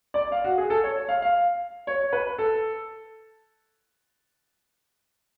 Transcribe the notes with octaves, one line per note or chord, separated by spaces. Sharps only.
D5
F5
F#4
G#4
A4
C#5
F5
F5
C#5
B4
A4